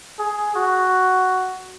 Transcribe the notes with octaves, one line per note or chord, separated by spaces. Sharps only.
G#4
F#4